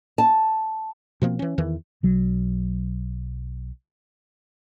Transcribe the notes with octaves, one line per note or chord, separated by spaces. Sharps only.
A5
B2 F3 A#3 C4
E3 C#4
E2 D#3 E3
B1 F#3